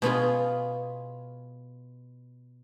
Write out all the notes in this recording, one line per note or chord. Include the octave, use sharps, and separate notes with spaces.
B2 B3 F4 G#4